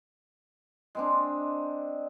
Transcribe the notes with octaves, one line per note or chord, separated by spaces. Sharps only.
G#3 C4 D4